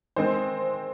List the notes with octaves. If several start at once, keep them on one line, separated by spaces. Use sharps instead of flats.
D#3 G#3 C4 C5